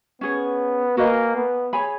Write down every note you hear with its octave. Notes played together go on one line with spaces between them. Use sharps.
B3 C#4 G#4 C#5
A#3 F#4 B4 D#5 G#5
B3
G#4 C#5 G#5 B5